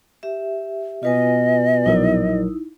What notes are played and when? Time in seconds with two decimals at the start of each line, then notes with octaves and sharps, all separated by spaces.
0.23 G4 E5
1.03 B2 F4 B4 D#5 G#5
1.86 A#1 F#3 D#4 E4 A#4